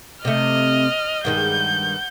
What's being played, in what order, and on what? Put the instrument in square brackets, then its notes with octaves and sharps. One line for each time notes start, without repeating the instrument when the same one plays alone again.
[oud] C3 A3 [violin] D#5 F6
[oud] G2 D#3 G#3 [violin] F#5 G6